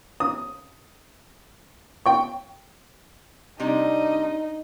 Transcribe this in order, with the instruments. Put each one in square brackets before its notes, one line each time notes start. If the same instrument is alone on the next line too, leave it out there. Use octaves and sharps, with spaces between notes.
[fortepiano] D#6
G5 C#6
[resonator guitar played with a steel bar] C3 G3 [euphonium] D4 [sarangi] D#4